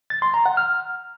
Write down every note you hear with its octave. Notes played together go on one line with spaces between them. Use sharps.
A6
C6
A#5
F#5
F6